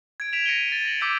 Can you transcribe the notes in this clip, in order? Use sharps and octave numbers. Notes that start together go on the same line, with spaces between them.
G#6 D7
B6 D7 E7 F7
A#6 C#7 D#7 G7
A6 A#6
A#6 F#7
D6 E6 G6 B6 C#7 E7